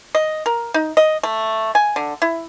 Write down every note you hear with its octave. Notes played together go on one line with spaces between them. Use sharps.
D#5
A#4
D#4
D#5
A3
G#5
D3
E4